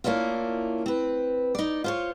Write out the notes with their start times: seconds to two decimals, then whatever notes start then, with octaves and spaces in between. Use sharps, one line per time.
0.04 A#3 C#4 D4 E4 F4
0.86 C4 B4
1.55 D#4 D5
1.84 F4 C5 C#5